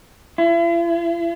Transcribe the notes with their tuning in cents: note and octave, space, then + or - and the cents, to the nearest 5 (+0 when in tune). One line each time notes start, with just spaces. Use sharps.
E4 +45